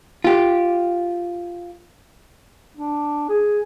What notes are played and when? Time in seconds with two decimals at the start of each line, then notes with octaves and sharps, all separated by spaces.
0.24 F4 G4
2.77 D4
3.29 G#4